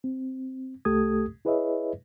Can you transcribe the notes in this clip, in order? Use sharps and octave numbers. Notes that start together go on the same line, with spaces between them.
C4
C2 A3 G4 A4 D#6 G#6
E4 G#4 B4 C#5 D#5 E5